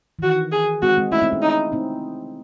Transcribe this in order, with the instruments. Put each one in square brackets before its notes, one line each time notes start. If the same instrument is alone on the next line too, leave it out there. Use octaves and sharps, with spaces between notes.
[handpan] E3
[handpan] D#3 [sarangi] F#4
[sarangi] G#4
[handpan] G#3 C4 [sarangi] F#4
[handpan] G#3 C4
[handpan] A3 C#4 [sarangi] E4
[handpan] C4 D#4
C#4 E4
[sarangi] D#4
[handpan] C4 D#4